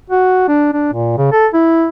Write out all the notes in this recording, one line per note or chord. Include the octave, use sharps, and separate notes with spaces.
F#4
D4
D4
A#2
C#3
A4
E4